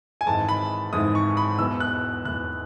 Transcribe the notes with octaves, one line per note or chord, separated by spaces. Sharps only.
G#5
G#1 G#2 E3 G#3 A5
B5
G#1 G#2 E3 G#3 D#6
C#6
B5
E1 E2 B2 E6
F#6
E1 E2 B2 F#6